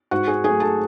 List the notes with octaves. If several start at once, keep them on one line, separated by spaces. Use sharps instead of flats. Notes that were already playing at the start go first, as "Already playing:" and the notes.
G#2 F#4 F#5
G#4 G#5
F#3 A3 G#4 G#5
A4 A5